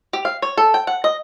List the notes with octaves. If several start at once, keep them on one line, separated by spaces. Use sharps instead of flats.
G4
F5
C#5
A4
G5
F#5
D#5